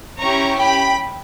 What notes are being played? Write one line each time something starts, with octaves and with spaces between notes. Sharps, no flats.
C#4 E4 G4 A#5 C#6
G5 B5